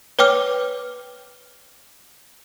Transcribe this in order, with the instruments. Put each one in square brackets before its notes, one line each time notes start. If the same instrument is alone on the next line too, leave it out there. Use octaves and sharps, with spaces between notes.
[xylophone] B4 C#5 G5 D6 F6